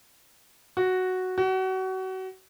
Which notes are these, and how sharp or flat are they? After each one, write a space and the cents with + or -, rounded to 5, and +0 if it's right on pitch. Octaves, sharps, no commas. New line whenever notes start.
F#4 +0
F#4 +30